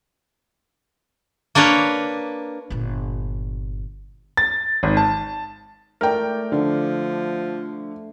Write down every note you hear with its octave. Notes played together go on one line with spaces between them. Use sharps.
A#3 D4 A#4 B4 C#5
G1 A#2
A6
G#1
A5
A3 A#4 D5 G5
D3 F3